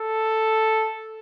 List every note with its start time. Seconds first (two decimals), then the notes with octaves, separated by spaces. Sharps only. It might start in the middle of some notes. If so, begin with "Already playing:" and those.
Already playing: A4